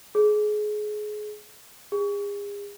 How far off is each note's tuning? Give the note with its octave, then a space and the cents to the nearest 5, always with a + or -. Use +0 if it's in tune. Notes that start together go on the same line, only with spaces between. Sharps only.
G#4 +25
G#4 -40